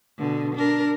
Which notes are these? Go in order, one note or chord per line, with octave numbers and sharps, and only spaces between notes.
B2 D3
D4 A#4